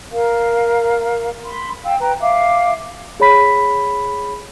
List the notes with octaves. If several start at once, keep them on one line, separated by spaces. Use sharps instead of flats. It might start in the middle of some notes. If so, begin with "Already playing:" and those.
A#4 F5
B5 C6
F5 G5 E6
B4 G5 A#5
E5 F5 D6
G#4 C#5 B5 B6